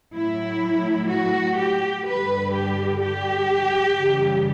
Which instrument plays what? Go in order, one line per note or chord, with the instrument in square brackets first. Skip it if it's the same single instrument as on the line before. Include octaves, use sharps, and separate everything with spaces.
[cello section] A2 F#3 E4
F#4
G4
G2 D3 G3 B4
G4
G4
F#2 C#3 E3 G3